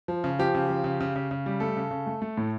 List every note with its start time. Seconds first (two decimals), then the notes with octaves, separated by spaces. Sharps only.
0.08 F3
0.24 C#3
0.39 F3 G4
0.54 C#3
0.69 F3
0.84 C#3
1.00 C#3
1.16 C#3
1.31 C#3
1.46 G3
1.60 A3 A4
1.77 C#3
1.91 C#3
2.06 A3
2.22 A3
2.37 A2